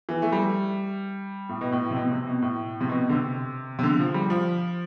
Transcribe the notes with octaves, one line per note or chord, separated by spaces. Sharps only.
E3
A3
G3
A2
B2
A2
C3
B2
C3
B2
A2
C3
B2
D3
C3
C3
D3
F3
G3
F3